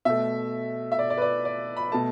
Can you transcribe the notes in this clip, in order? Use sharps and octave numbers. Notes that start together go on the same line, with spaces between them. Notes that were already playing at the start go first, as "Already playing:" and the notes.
B2 A3 E5
E5
D5
D5
B4
D5
D5
B5
B2 A3 A5